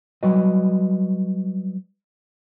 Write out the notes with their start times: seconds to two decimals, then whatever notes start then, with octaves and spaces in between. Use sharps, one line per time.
0.23 F#3 G3 F#4 B4 D#5